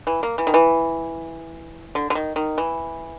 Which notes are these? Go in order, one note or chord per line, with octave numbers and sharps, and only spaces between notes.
E3
A#3
E3
D#3
E3
D3
D3
D#3
D#3
E3